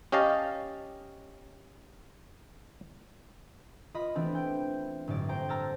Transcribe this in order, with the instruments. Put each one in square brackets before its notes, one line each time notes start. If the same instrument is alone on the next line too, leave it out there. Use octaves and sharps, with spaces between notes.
[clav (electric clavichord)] C#4 G4 D#5 F5 A5
[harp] F4 D#5 B5
E3 A3 B3 C4 D4
G5
G1 A2 F#3 D5
C5 G5 A#5
A5 A#5 E6 F6 A6